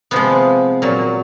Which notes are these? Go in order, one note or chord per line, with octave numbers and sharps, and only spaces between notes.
C3 F3 G#3 B3
A#2 F#3